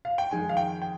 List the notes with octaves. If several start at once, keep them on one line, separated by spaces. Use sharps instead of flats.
F5
G5
F2 D#3 G#3 D#4 G#5
F5
G5
G5